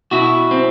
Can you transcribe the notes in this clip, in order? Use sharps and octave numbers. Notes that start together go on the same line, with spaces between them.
B2 E4 F#4
C4